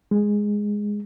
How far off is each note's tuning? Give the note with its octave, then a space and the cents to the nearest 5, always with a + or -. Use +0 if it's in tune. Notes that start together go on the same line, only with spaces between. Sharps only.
G#3 -5